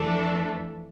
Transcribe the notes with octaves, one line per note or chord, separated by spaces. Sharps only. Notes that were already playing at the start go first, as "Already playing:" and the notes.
Already playing: F2 E3 A3 D4 A4